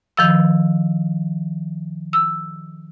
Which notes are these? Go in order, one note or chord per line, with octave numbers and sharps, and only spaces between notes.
D#3 F3 E6
E6